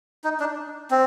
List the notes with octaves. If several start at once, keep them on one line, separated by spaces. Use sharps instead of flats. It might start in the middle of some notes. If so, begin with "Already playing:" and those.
D#4
D4
C4